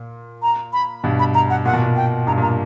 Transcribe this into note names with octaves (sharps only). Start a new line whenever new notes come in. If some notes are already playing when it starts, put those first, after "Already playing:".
Already playing: A#2
A#5
B5
G2 B2
B5
A#5
F#5
A#2 F#5
B2
A#2
G5
G2 A#5
A#2 A#5